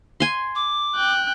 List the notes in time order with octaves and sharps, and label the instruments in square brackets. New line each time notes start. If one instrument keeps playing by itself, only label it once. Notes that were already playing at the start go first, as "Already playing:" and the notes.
[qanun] G#5 C6
[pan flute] D6
[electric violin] G5 F#6